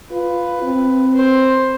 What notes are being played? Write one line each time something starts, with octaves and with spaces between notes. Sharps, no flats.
F4 B4
C4
C5